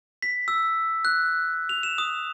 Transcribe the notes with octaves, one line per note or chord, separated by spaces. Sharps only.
B6
E6
F#6
F7
E7
D#6